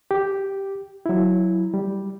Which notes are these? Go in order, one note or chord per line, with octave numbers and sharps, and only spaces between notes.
G4
F#3 E4
G3